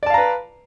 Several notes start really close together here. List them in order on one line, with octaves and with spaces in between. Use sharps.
D5 A5 F5 A#5 B4